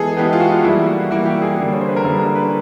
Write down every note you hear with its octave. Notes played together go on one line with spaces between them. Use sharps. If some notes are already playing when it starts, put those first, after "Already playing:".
Already playing: E3 G#3 B3 G#4 A4
E3 G#3 B3 G4
F4
F#4
F4
E3 G3 A#3 E4
F#4
E3 G3 A#3 F#4
G4
G#4
D3 G3 A#3
C#5
C5
B4
A#4
D3 G3 A#3 A4
A#4
B4